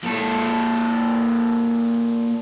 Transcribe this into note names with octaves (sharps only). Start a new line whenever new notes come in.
A#2 A4